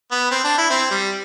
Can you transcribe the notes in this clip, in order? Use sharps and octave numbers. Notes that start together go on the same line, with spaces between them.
B3
C4
D4
E4
C4
G3